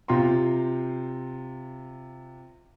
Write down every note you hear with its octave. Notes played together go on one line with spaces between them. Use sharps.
C3 F4 G5 A#5 C6